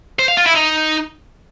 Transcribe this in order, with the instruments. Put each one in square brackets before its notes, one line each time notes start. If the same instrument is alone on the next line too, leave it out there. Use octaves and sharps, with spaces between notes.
[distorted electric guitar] C5
F5
F4
E4
D#4